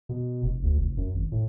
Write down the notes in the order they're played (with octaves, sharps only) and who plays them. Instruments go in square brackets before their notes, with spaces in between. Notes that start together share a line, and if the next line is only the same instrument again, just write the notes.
[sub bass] B2
F1
D2
F1
F#2
G#1
A2